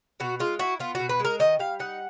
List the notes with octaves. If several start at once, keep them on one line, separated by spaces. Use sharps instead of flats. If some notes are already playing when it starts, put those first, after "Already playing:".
B2 F#4
G#3 F4
E4 F#4
B3 F4
B2 F#4
B4
G#3
A#4
D#3 D#5
G3 F5
D#4 F#5